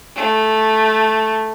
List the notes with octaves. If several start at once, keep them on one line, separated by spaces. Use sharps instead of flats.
A3